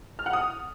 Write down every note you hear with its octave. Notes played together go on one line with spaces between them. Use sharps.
F6
F#5
D#6